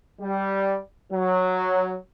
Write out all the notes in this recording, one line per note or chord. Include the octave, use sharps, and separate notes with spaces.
G3
F#3